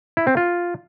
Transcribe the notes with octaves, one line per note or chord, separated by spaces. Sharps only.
E4
C4
F4